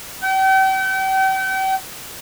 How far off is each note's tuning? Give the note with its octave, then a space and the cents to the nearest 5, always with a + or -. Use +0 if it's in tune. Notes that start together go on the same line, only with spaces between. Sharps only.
G5 -40